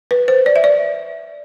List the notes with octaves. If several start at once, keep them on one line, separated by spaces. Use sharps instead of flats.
B4
C5
D5
E5
D5